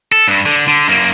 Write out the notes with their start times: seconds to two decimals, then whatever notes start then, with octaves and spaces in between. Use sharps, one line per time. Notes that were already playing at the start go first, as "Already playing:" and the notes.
0.12 A4
0.28 G2
0.46 D3
0.67 D3
0.88 F#2 A#3